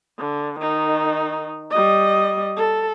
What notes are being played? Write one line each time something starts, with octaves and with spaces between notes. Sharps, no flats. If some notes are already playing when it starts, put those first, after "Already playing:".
D3
D#3 D#4
G3 D#5
A4